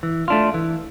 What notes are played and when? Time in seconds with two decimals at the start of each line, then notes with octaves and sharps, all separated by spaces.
0.03 E3
0.28 A3 D4 F4
0.54 E3